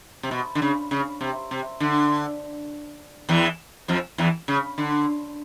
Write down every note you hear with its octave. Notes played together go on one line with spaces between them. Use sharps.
C3
B2
D3
C#3
C#3
C3
C3
D3
E2 E3
F2 F3
E2 E3
C#3
D3